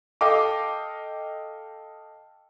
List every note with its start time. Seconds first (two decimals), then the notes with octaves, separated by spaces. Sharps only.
0.21 A4 D#5 F5 G5 D6